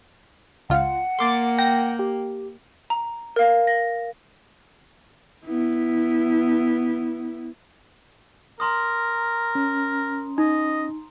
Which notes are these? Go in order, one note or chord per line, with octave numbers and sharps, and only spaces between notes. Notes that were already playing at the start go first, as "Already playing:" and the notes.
C#2 F4 F#5
A#3 C6 D6 A6
G5 A#6
G4
A#5
A#4 F5
A#6
B3 E4
A#4 A#5 C6 D#6
C#4
D#4 D#5